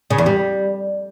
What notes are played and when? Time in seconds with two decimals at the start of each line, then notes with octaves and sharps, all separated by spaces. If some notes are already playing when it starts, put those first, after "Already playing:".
0.10 C#3
0.18 E2
0.26 G3